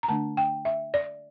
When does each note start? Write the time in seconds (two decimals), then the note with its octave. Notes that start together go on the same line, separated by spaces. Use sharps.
0.03 A#5
0.08 D3 A3 D4 A5
0.37 G5
0.65 E5
0.94 D5